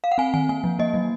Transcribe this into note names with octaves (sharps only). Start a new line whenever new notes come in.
F5
F#5
C4 G#5
D#3 G#5
A#3 G#5
F3
A#3 D#5
F#3